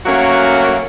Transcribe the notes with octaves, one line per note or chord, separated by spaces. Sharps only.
F#3 A3 A#3 C#4 F#4